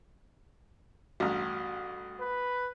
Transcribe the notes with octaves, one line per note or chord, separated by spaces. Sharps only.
A1 G2 F#4 A#5 D#6
B4